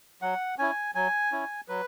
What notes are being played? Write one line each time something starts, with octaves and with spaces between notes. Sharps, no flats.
F#3 F#5
C#4 E4 G#5
F#3 G#5
C#4 E4
F#3 B4